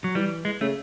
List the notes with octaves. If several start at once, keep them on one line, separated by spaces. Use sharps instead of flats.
F#3
E3 G3
G#3
C#3 A3